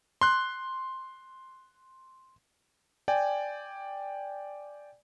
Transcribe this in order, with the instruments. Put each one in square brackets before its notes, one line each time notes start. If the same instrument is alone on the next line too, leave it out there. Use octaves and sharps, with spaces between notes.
[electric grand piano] C6 F#6
D5 G5 G#5